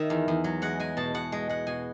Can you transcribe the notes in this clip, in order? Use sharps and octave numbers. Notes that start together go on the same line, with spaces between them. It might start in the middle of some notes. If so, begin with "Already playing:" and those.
Already playing: D#3 C#5 E5
E2
E2
F#3
G#3 F#5
G#3 G#5
B2 A5
B2 F#5
G#3
G#3 F#5
B2 G#5